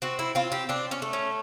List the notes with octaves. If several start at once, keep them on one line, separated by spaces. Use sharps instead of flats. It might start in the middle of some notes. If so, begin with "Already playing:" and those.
C4 F#4
E4
C4 F4
G4
C4 D4
C#4
A3
C#4